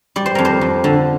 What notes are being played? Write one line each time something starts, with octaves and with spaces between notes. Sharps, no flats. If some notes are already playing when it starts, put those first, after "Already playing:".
G3 D5
C5
F2 A#4
C5
F2
D3